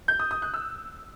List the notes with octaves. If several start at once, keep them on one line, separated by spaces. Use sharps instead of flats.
G6
D#6
D#6
F#6
E6